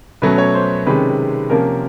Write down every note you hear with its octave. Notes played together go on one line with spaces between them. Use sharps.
B2 F#3 A3 C#4 B4
C#5
C5
C3 D#3 G#3 C#4 B4
C3 F3 A#3 C#4 A#4